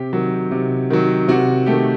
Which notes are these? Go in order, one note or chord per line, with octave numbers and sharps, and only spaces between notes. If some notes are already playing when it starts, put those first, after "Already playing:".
Already playing: C3 G4
D#3 F#3
C3
D#3 F#3
C3 F#4
D#3 A3 G4